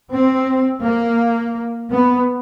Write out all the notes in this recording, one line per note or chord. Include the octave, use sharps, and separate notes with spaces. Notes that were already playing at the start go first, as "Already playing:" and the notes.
C4
A#3
B3